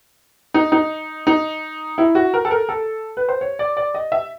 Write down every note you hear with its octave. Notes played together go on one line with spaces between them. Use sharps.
D#4
D#4
D#4
E4
F#4
A#4
A4
A#4
A4
B4
C5
C#5
D5
D5
D#5
E5